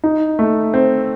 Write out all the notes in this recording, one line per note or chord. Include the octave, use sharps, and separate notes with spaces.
D#4
A3
C4